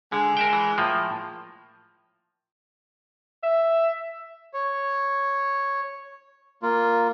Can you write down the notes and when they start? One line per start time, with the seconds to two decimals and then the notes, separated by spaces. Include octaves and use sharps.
0.12 D3 G#3
0.37 A#4 E5 G5
0.53 E3
0.78 A2 F3 A#3
3.43 E5
4.54 C#5
6.62 A#3 F4